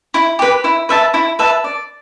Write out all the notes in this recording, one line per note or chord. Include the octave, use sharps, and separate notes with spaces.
E4
G4 B4
E4
B4 E5 A5
E4
B4 E5 A5
D5